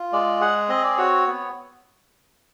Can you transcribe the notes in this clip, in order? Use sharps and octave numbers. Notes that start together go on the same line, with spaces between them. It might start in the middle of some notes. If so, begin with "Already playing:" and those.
Already playing: F4
G#3 D5
G#4 F#5
C4 D#5
D5
F#4 C#5
B3